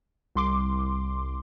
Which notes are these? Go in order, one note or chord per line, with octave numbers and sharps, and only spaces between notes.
C2 C6 D6